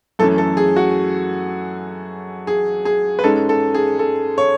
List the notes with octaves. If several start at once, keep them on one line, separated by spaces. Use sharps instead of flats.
F#2 E3 A3 C#4 A4
A4
G#4
F#4
G#4
G#4
B4
G#2 G#3 C#4 A4
A4
G#4
A4
C#5